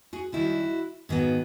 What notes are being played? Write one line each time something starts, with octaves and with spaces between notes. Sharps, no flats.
F#4 G#4
F#2 D#3 G3 E4 F#4
G#2 D#3 F#3 B3